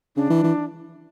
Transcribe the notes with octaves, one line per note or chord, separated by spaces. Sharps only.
C#3 D4
E3
E3